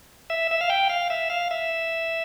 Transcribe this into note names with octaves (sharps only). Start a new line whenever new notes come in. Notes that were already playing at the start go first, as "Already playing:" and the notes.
E5
E5
F5
G5
F5
E5
F5
E5